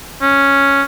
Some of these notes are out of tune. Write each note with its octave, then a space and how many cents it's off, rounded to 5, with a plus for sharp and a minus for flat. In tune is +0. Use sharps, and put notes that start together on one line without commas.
C#4 +0